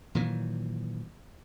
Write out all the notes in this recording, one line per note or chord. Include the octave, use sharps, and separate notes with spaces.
A#2 D#3 E3 F#3